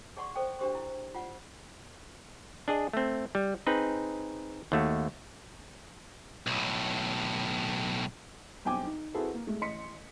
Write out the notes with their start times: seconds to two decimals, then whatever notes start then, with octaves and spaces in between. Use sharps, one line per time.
0.17 G#4 D5 F#5 C6 C#6
0.35 A4 C5 D5 G5
0.59 D4 F#4 G4 C5 C6
0.75 E4
1.15 F4 D5 F#5
2.68 D4 G#4 D#5
2.93 A3 C4
3.35 G3
3.67 C4 D#4 G#4 B4
4.72 D#2 A3 F#4
6.47 B1 A2
8.65 B1 G2 C4 G5 G#5 D6
8.86 D#4
9.14 C4 E4 F#4 G#4 A4 B4
9.34 A#3
9.47 G#3 A3
9.61 A1 D#5 C6 B6 C#7